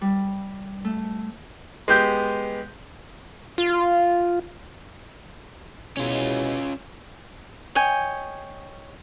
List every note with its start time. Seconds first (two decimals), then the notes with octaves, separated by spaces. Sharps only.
0.01 G3
0.85 A3
1.88 G#3 B3 G4 G6
3.58 F4
5.97 B2 G#3 C#4 E4 F4 C#5
7.75 C#5 D#5 G5 G#5